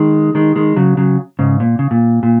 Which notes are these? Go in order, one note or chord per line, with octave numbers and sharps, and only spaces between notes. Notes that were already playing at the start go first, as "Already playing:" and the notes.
Already playing: D#3 G#3
D#3 G#3
D#3 G#3
C#3 F#3
C#3 F#3
G#2 C#3
A#2
C#3
A#2
A#2